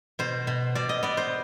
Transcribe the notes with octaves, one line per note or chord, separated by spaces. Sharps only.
B2 C5
B2
B2 D5
D#5
B3 D5
C5